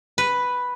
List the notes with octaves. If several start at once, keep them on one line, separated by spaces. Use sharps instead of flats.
B4